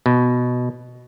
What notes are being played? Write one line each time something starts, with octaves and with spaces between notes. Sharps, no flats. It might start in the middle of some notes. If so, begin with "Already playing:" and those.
B2